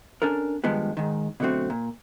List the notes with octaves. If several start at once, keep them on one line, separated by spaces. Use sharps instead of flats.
C#4 D4 A4 A#4
G2 D#3 F3 G#3 B3
G#2 D#3
B2 D3 F#3 A3 C4 F#4
A#2